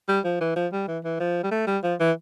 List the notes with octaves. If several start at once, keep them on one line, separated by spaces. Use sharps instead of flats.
G3
F3
E3
F3
G3
E3
E3
F3
G3
A3
G3
F3
E3